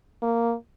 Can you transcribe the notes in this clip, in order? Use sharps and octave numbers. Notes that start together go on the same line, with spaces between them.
A#3